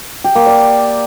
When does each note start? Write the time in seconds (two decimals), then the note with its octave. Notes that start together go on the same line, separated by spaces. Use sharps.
0.24 G4
0.35 A#3
0.46 D5